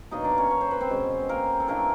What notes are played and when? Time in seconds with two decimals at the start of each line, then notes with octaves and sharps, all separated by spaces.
0.11 B2 F#3 A#3 D4 D#4 D#5
0.24 D4 D5
0.38 C#4 C#5
0.51 C#5
0.61 C5
0.71 B4
0.81 C4 C5
0.90 B2 G#3 C#4
1.29 A#3 A#4
1.60 A4
1.68 E3 A3 A#3 D4 A#4